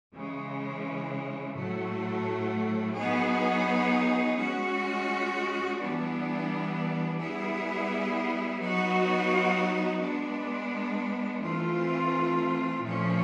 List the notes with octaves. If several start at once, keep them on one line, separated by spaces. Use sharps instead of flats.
C#3 E3 G#3
A2 F#3 A3
F#3 B3 D#4 G#4
G#3 C#4 F#4
E3 G3 B3 D4
G3 B3 E4 G#4
F#3 B3 D#4 F#4
G#3 B3 D4
E3 A3 C4 F4
A#2 F3 A3 C#4